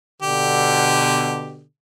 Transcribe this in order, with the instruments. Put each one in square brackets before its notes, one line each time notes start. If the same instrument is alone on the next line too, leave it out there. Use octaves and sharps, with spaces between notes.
[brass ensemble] B2 D3 [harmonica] G4